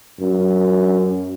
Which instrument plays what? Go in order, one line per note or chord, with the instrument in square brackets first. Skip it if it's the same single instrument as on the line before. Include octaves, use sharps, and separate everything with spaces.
[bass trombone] F#2